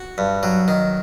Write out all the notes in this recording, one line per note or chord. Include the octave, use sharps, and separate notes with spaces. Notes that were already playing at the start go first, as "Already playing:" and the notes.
Already playing: F#4
G2
F#3
D#3